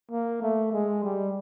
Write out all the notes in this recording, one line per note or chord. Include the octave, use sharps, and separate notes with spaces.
A#3
A3
G#3
G3